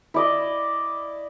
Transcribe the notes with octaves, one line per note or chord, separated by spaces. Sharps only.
E4 D5 D#5